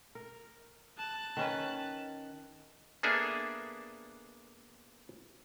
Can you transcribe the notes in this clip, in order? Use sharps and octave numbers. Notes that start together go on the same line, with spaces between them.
A#4
A5 F#6
D#3 C#4 B4
A#3 B3 D4 G#4 A4 E5